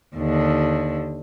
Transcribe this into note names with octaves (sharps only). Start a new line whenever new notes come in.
D#2 D3